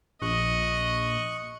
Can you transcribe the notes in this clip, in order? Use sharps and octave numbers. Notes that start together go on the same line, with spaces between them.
A#1 D#5 C#6 F#6